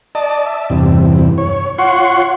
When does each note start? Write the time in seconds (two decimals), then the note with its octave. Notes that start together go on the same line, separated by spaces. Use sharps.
0.15 D5 D#5 A5
0.46 E5
0.70 E2 G2 C3
1.38 C#5
1.78 F4 C#5 F#5 C6 C#6